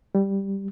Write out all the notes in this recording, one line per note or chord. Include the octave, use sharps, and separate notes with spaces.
G3